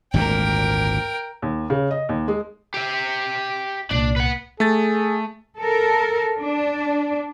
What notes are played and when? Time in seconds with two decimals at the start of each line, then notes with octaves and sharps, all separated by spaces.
0.14 G#1 D2 A#2 A#4 G5
1.42 D#2
1.70 C#3
1.91 D#5
2.09 D#2
2.28 G#3
2.74 G4 E5
3.91 C2 A#2 D4
4.16 B4 F#5
4.60 A3 G#4 A6
5.58 A4 A#4
6.38 D4